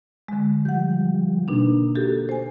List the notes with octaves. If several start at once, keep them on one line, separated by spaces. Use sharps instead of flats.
D3 G#3
F3 G3 F#5 G6
B2 A#3 D4 D#4
F#4 G4 A4
C5 G#5